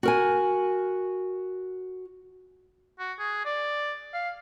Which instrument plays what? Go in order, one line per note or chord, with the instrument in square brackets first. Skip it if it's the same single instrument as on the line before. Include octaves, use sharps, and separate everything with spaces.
[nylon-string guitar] F#4 A#4 G#5
[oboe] F#4
G#4
D5
F5